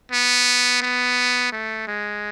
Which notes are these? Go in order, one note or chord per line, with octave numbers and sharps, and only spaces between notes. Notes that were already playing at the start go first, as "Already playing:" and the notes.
B3
B3
A3
G#3